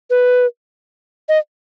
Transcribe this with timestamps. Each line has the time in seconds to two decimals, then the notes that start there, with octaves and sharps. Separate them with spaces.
0.10 B4
1.29 D#5